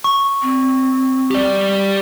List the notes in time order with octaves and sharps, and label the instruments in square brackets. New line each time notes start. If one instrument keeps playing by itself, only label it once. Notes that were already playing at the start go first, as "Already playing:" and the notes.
[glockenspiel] C#6
[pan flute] C4
[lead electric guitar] G4 D5